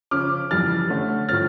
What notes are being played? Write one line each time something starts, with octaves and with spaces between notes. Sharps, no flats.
C#3 F3 C#4 D6 F6
F2 E3 G3 F6 A6
D3 A3 C#4
A2 F3 C#4 F6 A6